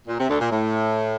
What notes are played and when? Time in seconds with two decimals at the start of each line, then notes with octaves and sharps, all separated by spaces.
0.07 A#2
0.19 C3
0.29 D2 D3
0.40 A#2
0.51 A2